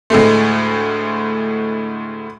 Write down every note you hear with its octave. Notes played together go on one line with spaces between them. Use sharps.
D2 A2 G#3 A3